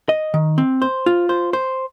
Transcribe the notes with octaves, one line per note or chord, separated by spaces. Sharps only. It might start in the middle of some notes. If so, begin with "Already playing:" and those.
D#5
D#3
C4
C5
F4
C5
C5